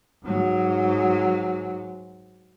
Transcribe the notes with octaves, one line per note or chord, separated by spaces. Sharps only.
G#2 F#3